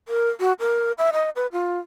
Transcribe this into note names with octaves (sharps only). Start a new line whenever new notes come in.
A#4
F#4
A#4
E5
D#5
B4
F4